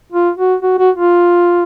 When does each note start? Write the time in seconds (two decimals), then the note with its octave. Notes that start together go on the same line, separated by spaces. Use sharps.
0.12 F4
0.38 F#4
0.62 F#4
0.79 F#4
0.95 F4